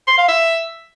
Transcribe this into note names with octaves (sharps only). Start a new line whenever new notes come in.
C6
F5
E5